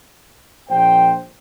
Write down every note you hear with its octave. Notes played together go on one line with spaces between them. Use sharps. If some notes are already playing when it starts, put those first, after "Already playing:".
A#1 C5 G5